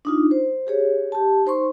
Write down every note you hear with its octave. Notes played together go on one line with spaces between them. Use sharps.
D4 D#4 F4
C5
G4 G#4 C#5
G4 A5
D#4 C5 C6 C#6